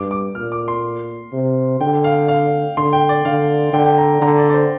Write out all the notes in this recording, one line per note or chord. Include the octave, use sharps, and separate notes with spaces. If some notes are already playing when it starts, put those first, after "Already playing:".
Already playing: G2 D6
D6
A#2 F6
D6
C6
C3
D3 G5
F5
F5
D3 C6
G5
D5
D3 F5
D3 G5
G5
A#5
D3 A#5
D5
D5
C5